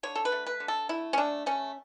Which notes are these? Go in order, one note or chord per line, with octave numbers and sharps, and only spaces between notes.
D3 C#5
A4
B4
A3
B4
D3
A4
A3 E4
C#4
A3 D4
A3 C#4